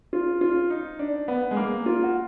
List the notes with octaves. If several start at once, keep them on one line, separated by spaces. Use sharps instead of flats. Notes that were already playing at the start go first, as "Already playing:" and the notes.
F4
F4
D#4
D4
B3
G#3
A#3
F4
F#4